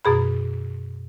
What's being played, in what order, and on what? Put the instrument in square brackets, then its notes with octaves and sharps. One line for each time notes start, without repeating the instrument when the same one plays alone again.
[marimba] F#2 B2 G#4 B5